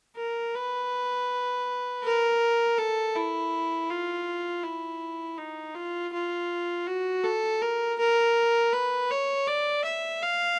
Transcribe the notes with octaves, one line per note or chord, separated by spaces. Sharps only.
A#4
B4
A#4
A4
E4
F4
E4
D#4
F4
F4
F#4
A4
A#4
A#4
B4
C#5
D5
E5
F5